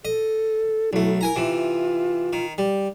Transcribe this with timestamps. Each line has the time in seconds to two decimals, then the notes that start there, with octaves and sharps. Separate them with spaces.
0.05 A4 D#5
0.93 B1 A3 E4
1.21 E4 A#4 G#5 A#5
1.36 C3 E3 F4
2.33 D#3
2.58 G3